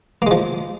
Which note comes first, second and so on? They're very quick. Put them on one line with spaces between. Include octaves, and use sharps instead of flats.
A#3 G#3 F3